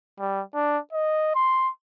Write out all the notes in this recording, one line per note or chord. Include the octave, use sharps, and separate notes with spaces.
G3
D4
D#5
C6